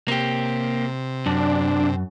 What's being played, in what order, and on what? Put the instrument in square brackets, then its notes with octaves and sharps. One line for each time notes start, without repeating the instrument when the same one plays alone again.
[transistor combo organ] C3 [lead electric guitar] A#3 G4
[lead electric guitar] F#2 [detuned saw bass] D4